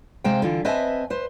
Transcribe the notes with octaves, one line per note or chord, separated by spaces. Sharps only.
C3 G#3 C5 F5 G5
D3 E3 F4
C4 B4 D#5 E5 G#5 A5
B4 C5